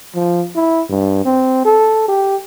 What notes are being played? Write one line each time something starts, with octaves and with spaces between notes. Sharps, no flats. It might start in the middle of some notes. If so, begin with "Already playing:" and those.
F3
E4
G2
C4
A4
G4